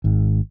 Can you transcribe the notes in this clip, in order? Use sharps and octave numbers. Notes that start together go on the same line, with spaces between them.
G#1 G#2